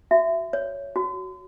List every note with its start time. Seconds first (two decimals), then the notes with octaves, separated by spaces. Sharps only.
0.11 F#4 E5
0.53 C#5
0.96 F#4